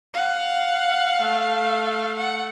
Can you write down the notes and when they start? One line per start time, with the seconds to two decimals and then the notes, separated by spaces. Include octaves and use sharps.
0.14 F5 F#5
1.21 A3
2.17 F#5